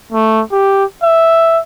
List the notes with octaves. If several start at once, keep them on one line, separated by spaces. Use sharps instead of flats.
A3
G4
E5